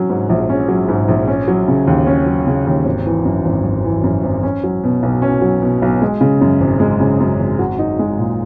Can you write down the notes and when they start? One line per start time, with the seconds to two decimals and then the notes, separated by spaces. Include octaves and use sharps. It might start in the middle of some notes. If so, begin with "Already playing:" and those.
Already playing: F#3 C#4
0.10 G#2
0.29 A#1
0.49 C#4
0.68 F#3
0.89 G#2
1.08 A#1
1.28 C#4
1.48 F#3
1.68 C#3
1.87 D#2
2.07 C#4
2.26 F#3
2.47 C#3
2.67 D#2
2.85 G#1
3.06 E3
3.25 F#2
3.45 G#1
3.65 G#1
3.84 E3
4.04 F#2
4.23 G#1
4.43 C#4
4.64 F#3
4.84 B2
5.03 B1
5.22 C#4
5.42 F#3
5.62 B2
5.82 B1
6.02 G#3
6.21 C#3
6.41 F#2
6.60 G#1
6.80 G#3
7.00 C#3
7.20 F#2
7.39 G#1
7.59 F#4
7.79 D#4
7.99 G#3
8.19 A#2